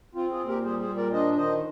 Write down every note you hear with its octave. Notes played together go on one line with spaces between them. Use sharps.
C4 F4
F4 G#4
A#2
G4 A#4
G3 G#4 C5
G#4 C5
A#2
A#4 D5
D4 C5 D#5
D#3 C5 D#5